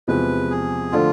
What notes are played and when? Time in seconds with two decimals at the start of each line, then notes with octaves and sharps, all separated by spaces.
0.08 E2 C3 F3 G#3 B4
0.50 G#4
0.92 D3 F3 A3 D4 F4